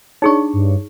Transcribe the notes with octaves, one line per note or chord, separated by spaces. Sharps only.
D4 D#4 G#4 C#5 C#6
G2